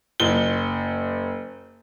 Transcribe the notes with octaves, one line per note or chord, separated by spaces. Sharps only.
F#1 G7